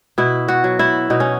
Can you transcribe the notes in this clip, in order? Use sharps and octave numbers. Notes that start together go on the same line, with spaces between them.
B2 E4
F#4
F#3
E4
B2 D#4
C#4